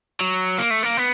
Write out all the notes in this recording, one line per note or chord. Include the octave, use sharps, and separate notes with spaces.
F#3
A#3
A3
A#3
B3